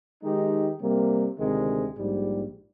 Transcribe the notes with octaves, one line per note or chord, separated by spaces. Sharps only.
D#3 G#3 D#4 G4
C3 G3 A#3
D2 C3 D#3 G#3
A#1 G#2 G3